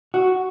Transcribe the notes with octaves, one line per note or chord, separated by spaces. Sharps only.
F#4